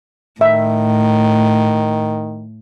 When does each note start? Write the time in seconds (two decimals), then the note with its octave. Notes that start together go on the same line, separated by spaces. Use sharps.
0.41 A2 D#3 E5